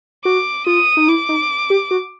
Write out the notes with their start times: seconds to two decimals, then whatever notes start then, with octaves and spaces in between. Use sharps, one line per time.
0.25 F#4 D6
0.67 F4 D#6
0.97 D#4
1.08 E4 D6
1.29 D#4
1.70 G4
1.91 F#4